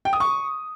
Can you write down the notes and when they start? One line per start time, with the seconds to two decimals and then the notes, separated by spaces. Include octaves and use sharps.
0.05 G5
0.13 D#6
0.20 C#6